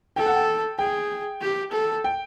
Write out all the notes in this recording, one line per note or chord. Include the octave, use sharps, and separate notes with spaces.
A4 G5
F#5
G5
G#4 G5
G4
A4
G5